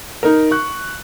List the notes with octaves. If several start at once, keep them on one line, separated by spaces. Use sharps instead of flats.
D#4 A#4
C#6 F#6